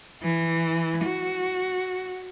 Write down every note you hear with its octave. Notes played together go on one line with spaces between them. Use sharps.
E3
F#4